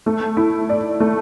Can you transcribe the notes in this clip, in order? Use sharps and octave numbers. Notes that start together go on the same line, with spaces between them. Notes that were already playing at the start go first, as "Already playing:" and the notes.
A3
E4
D5
A3